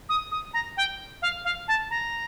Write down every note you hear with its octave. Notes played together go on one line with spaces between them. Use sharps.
D#6
D#6
A#5
G5
F5
F5
A5
A#5